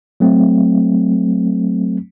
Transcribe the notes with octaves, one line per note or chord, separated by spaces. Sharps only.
F#3 A3 C4